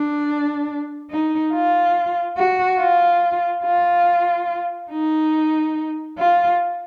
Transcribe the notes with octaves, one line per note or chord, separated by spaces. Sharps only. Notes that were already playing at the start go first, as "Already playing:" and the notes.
Already playing: D4
D#4
F4
F#4
F4
F4
D#4
F4